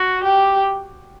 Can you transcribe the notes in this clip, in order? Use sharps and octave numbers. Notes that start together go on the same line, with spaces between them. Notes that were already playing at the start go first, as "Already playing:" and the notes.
Already playing: F#4
G4